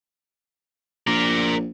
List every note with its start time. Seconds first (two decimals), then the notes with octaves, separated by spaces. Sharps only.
1.07 A#1 A#4 D5